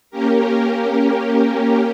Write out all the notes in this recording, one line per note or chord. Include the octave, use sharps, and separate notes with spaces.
A#3 C#4 G4 A#4